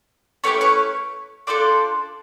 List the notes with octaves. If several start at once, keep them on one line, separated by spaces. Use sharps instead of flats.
A3 C#4 E4 G4 B4 C#5
B4 C#5
D4 F4 A4 C5 D5